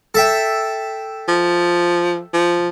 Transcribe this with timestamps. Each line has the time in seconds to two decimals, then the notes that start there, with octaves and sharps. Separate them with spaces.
0.14 A4 E5 G5
1.29 F3
2.34 F3